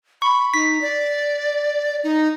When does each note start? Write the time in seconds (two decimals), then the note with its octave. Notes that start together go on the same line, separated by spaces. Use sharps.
0.22 B5 C#6
0.54 D#4 B6
0.81 D5
2.04 D#4